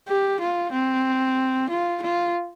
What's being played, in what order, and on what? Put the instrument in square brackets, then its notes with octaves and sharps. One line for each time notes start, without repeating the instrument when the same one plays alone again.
[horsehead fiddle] G4
F4
C4
F4
F4